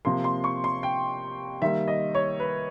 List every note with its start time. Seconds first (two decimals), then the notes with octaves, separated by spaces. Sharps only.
0.05 C3 F3 A#3 C6
0.24 C6
0.44 C#6
0.64 C6
0.83 G5
1.62 D#3 G3 A#3 E5
1.88 D#5
2.15 C#5
2.40 B4